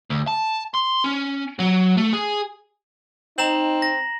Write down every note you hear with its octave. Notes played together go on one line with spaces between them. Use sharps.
D2
A5
C6
C#4
F#3
A3
G#4
C4 D#4 A#5 E7 F#7
A#6